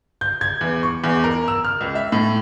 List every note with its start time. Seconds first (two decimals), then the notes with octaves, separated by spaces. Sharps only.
0.21 G6
0.41 G#6
0.61 E2
0.83 C#6
1.04 E2
1.24 A#4
1.48 E6
1.65 F6
1.81 C#2
1.95 E5
2.12 A2